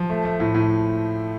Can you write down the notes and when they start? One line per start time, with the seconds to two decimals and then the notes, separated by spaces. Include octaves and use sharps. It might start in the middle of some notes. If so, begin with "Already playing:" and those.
Already playing: F3
0.10 A3
0.25 A3
0.40 A2
0.54 A2